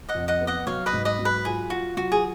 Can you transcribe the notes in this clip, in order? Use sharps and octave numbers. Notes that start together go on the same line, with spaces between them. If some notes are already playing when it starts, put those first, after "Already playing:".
D#5 F#5
F2
D#5 F#5
B3
D#5 F#5
F#3 C#5 F5
B4 D#5
G#2
B4 D#5
F#3
B4
F4 G#4
F4 F#4
F#3 F#4
G#4